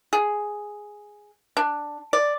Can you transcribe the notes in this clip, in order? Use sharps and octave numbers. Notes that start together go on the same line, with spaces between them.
G#4
D4
D5